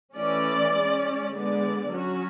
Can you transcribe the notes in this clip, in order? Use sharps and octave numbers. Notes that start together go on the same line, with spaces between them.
E3 A3 C#4 D5
G#3 C#4
D3 G#3 B3 D5
F#3 C#4 F#4